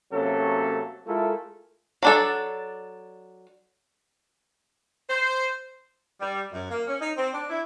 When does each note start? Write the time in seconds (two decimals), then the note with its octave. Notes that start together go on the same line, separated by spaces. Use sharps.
0.12 C3 F#3 A3 A#3 C#4 A4
1.06 G#3 A3 E4 F4 A4 A#4
2.03 F#3 D4 A4
5.10 C5
6.21 G3
6.53 F#2
6.71 A#3
6.87 C#4
7.01 D#4
7.17 C4
7.33 D4
7.50 E4